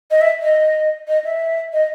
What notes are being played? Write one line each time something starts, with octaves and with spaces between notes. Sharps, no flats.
D#5
E5
D#5
D#5
E5
D#5